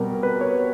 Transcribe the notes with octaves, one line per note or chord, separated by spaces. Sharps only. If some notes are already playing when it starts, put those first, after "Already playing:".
Already playing: B2 G3 C4 A#4
B4
C#5